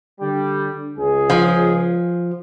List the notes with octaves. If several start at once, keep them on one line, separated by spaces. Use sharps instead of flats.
D3 G3
C#2 G#4
F3